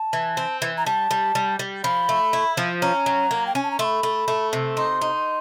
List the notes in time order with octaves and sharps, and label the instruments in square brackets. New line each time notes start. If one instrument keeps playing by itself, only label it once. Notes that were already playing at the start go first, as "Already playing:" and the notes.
Already playing: [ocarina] A5
[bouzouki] E3
C4
E3
[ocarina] A#5
[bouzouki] G3 [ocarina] A5
[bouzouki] G3
G3
G3
[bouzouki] F3 [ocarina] B5
[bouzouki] A3
E4
F3
[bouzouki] C#4 [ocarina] A#5
[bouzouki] F#3
A#3
[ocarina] G5
[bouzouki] C#4 [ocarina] G#5
[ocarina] A5
A#5
[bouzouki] A3 [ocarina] C6
[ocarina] B5
[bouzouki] A3
A3
C3
[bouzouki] D#4 [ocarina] C6
[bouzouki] D#4